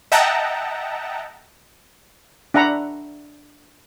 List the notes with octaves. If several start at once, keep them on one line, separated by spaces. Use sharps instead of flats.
D#5 E5 F#5 G5 A5 A#5
D4 E5 F#5 A#5 B5